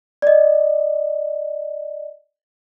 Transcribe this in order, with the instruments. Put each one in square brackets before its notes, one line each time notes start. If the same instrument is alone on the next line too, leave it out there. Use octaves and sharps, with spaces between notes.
[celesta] D5 D#5